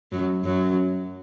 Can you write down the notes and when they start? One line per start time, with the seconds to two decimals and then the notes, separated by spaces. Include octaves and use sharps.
0.12 F#2 F#3
0.44 F#2 F#3